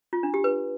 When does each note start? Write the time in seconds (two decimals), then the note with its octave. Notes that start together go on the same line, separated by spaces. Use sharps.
0.13 F4
0.23 D4
0.34 G4
0.44 B4